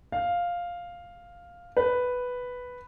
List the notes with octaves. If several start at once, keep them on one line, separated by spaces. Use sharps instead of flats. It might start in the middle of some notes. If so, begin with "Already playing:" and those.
F5
B4